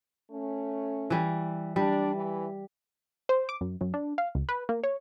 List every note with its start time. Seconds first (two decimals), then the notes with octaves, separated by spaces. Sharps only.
0.31 A3 C#4
1.10 E3 G3
1.76 G3 D4
2.15 E3
3.29 C5
3.49 D6
3.61 F#2
3.81 F#2
3.94 D4
4.18 F5
4.35 C#2
4.49 B4
4.69 A#3
4.84 C#5